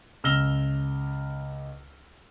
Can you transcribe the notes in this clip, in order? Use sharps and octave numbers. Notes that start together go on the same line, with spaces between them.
C#2 E6 F6 A#6 E7 G7